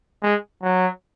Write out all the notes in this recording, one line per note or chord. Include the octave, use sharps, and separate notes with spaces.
G#3
F#3